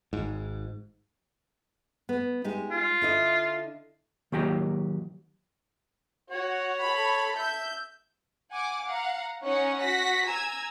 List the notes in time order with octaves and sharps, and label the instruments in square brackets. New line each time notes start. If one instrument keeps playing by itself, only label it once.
[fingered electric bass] G#1 G#2
[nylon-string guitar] B3
G#3 D#4 G4
[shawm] F4
[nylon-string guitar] D3 E4 D#5
[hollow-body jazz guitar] D#3 F#3 A#3 G4 G5 A#5
[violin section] F#4 [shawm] C#5
[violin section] A4 B5
[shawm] E5 [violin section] G6
[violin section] F#5 G#5 D6
F5 F#5 A#5
C#4 D#4 C#5 F#5 C#6
F#4 F#5 A#6 B6
G#5 A#5 E6 G#6